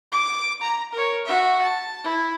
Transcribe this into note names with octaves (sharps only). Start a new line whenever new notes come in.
D6
A#5
A#4 C#5
F#4 E5
A5
E4